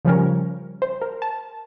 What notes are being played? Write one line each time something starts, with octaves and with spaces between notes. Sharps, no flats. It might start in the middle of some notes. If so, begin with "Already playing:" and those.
C#3 F3 G3 C#4 A#4
C5
A#4
A5